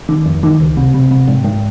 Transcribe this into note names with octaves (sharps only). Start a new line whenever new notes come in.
D#3
F2
D#3
C#2
C3
C3
C3
G#2
G#2